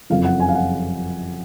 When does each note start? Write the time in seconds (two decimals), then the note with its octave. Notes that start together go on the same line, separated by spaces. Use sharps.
0.10 F#1 F2 F3 F5
0.25 F#5
0.40 G#5
0.49 F5
0.55 F#5